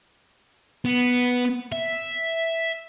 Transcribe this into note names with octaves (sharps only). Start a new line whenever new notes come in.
B3
E5